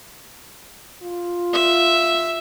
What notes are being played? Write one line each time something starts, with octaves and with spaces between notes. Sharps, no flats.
F4
E5